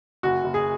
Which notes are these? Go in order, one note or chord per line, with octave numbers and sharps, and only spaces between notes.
F#1 F#4
F#1
G#4